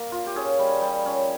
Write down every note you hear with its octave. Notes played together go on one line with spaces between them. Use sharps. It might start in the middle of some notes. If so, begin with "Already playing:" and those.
Already playing: A#3 A#4
F4
G4
C#4 G#4
G3
G3
C#4